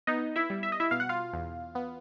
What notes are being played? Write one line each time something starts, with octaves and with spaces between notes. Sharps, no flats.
B3 D#4 D#5
E4 E5
G3
E5
D#5
E4 E5
B2 F5
F#5
F4 F5
E2
B3